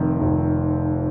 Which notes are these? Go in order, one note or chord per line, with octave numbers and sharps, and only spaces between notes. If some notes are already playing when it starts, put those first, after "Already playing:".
Already playing: F1 F2 D#3
F1 F2 D#3